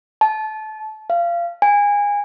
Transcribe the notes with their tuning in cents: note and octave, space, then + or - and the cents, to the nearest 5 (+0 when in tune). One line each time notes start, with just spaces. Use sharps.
A5 -25
F5 -25
G#5 -25